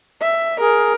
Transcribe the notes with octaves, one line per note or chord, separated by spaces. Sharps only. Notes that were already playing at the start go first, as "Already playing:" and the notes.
E5
G#4 A#4